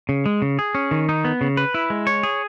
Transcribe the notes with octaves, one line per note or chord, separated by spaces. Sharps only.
C#3
G#3
C#3
G#4
C#4
D#3
D#4
B3
C#3
B4
E4
G#3
C#5
G#4